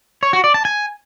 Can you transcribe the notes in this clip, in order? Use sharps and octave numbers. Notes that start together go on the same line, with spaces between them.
C#5
F#4
D5
A5
G#5